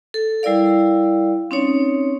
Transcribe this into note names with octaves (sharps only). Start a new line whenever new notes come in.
A4
G3 E4 A#4 D5 F5
C4 C#4 D#4 C#5